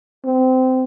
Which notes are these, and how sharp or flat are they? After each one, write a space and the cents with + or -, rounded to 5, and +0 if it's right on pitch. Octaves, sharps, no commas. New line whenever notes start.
C4 -20